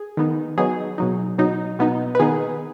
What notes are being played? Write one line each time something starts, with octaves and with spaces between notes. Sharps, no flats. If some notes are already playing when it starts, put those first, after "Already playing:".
Already playing: G#4
D#3 B3 D#4
F#3 B3 D#4 G#4
B2 F#3 D#4
B2 F#3 D#4
B2 B3 D#4
B4
D#3 B3 D#4 G#4